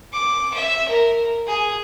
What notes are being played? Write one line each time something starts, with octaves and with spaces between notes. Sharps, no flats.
D6
E5
A#4
G#4